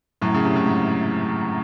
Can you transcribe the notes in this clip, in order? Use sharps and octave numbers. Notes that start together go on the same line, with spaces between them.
F#2 A2
C#3
C3
A2
G#2